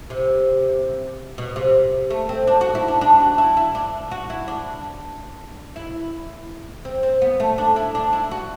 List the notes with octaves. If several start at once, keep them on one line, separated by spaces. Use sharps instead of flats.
C3
B2
C3
A3
C4
D4
F#4
E4
D4
D4
F#4
E4
E4
D4
F#4
E4
D4
E4
C4
C4
B3
A3
D4
E4
D4
E4
F#4